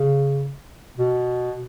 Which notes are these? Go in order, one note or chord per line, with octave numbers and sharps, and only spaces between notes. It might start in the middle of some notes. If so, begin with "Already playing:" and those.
Already playing: C#3
B2